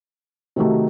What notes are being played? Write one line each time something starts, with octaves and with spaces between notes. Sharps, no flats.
C3 D#3 F#3 A3